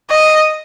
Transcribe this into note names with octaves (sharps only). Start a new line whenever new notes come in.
D#5